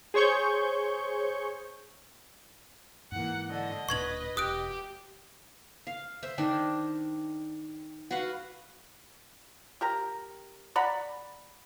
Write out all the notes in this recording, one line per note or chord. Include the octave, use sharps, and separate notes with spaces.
G#4 C5 C#5 C#6 G6
G#2 E3 A#3 F#5
D3 D#5
D1 A#2 D4 B4 C#6 G#6 F#7
E1 G4 D#6 F#6 D7
F5
C5 E5
D#3 D4
F#4 B4 F5 F#5
G4 A#4 A#5
D5 F#5 A#5 B5